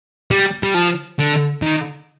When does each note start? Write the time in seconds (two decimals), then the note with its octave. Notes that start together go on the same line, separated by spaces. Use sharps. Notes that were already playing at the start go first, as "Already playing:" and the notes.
0.31 G3
0.63 G3
0.74 F3
1.19 D3
1.62 D#3